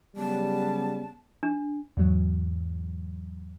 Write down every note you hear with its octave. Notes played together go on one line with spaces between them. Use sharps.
C#3 F#3 G3 B3 A5
D4
E2 G#2 F#3